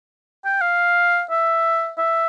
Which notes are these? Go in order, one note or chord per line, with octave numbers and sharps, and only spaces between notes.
G5
F5
E5
E5